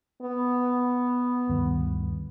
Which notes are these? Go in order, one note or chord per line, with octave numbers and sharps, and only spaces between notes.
B3
D2 G2 D#3